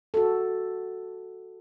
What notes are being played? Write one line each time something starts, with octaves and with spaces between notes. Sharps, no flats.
F#4 A4